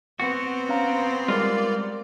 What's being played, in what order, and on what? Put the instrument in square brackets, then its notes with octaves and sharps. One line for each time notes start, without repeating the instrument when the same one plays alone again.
[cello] B3 C4 [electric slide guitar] F#4
[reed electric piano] C#4 F5 A#5
[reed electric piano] G3 G#3 [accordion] A#3 D5 [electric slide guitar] F4